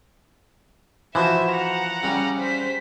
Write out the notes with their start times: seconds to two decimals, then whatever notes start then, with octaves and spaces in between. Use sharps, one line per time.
1.15 E3 F3 F#4 C5 E5 E7
1.51 F#5 A#5
2.03 C#3 G3
2.40 C5 B6